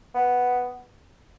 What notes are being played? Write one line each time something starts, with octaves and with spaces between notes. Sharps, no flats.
B3